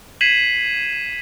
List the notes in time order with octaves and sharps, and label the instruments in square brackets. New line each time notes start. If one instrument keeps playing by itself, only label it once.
[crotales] G#6 B6 C7 D#7 E7 F#7